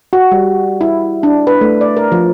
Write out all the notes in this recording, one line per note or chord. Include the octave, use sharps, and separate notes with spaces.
F#4
G3
E4
D4
B4
A3
D5
A#4
F3